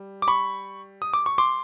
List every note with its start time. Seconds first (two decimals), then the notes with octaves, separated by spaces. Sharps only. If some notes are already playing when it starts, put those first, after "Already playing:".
Already playing: G3
0.22 D6
0.28 B5 C#6
1.02 D#6
1.14 D6
1.26 C#6
1.38 C6 D6